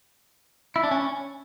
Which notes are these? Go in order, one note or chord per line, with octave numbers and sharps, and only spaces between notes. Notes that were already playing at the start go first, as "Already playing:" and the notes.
E4
D4
C#4